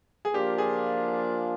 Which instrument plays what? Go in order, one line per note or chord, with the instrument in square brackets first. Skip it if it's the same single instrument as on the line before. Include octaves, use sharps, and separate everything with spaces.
[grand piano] G#4
[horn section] F3 A#3 D4 F4 [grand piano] G4
[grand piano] G#4